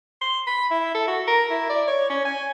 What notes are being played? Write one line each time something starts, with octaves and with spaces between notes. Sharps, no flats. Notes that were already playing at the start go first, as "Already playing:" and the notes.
C6
B5
E4
A4
F#4
A#4
E4
D5
C#5
C#4
G#5